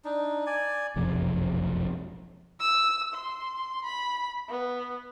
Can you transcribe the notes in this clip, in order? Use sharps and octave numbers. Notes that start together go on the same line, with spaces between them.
D4 D#4
D5 G#5
F#1 B1 F2 C3
E6
C6
B5
B3